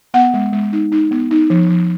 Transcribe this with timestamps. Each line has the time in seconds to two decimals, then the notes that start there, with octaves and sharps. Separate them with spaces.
0.14 B3 F#5
0.34 G#3
0.53 G#3
0.73 D#4
0.92 D#4
1.11 B3
1.31 D#4
1.50 F3
1.70 F3